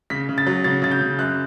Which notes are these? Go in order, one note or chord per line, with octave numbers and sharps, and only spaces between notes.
C#3 B6
C#3
A6
F#3
C#3 A6
C#3 A6
G6
C#3
F#2 F#6